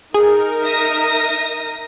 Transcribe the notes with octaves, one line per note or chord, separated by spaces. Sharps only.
D#4 G#4 A#4
E5 D#6 A#6